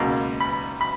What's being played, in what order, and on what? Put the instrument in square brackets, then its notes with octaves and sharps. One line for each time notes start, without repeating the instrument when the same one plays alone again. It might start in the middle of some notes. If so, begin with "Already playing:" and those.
Already playing: [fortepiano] C#2 B2 A#3 A#5
B5
B5